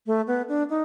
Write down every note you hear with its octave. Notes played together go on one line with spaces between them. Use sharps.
A3
B3
D4
D#4